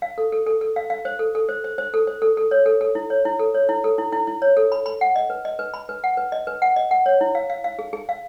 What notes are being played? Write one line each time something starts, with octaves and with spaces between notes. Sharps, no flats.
F5
A4
A4
A4
A4
F5
F5
C5
A4
A4
C5
C5
C5
A4
C5
A4
A4
C#5
A4
A4
E4
C#5
E4
A4
C#5
E4
A4
E4
E4
E4
C#5
A4
B5
B5
F#5
D#5
B4
D#5
B4
B5
B4
F#5
B4
D#5
B4
F#5
D#5
F#5
C#5
E4
F5
F5
F5
G#4
G#4
F5